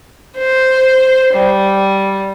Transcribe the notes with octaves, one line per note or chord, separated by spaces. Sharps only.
C5
G3